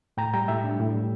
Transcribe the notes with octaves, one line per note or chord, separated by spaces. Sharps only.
A2 G5 A#5
G3 G5 A#5
A2 E5 G5
D4
A2
G3